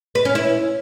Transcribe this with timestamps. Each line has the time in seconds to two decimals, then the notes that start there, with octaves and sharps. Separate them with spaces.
0.15 B4
0.25 C#4
0.35 E4